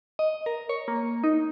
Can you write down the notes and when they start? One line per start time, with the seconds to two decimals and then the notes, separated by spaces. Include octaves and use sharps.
0.19 D#5
0.46 A#4
0.69 C#5
0.88 A#3
1.24 D#4